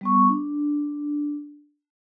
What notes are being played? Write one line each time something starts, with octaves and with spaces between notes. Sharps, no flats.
G3 B3 C#6
D4